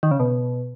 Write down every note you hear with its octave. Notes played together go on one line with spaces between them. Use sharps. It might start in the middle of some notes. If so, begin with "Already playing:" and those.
D#3
C#3
B2